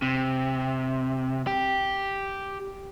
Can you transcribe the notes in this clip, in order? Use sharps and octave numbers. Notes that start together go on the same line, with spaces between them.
C3
G4